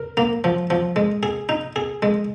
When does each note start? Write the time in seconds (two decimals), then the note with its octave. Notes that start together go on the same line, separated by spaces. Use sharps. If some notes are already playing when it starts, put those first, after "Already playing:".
Already playing: A#4
0.17 A#3
0.44 F3
0.70 F3
0.96 G#3
1.23 G#4
1.49 D#4
1.76 G#4
2.02 G#3